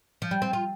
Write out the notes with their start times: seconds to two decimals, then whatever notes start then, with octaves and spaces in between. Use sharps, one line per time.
0.22 F3
0.31 G3
0.42 C4
0.53 F4